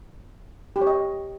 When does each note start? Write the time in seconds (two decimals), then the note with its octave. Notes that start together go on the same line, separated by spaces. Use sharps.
0.76 G4
0.81 C#5
0.87 D#5